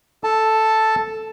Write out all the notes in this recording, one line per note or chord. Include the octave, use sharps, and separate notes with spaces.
A4 A5